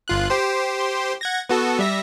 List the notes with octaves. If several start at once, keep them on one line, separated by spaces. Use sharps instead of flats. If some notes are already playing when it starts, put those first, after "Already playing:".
G1 F4 F#6
G4 C5 C6
F#5 G#6 A#6
B3 F#4 A4
G3 E5 A#6